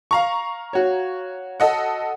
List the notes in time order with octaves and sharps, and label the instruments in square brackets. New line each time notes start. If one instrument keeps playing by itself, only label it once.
[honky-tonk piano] F5 A#5 C#6
[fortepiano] F#4 C#5
[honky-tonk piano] A4 D#5 F#5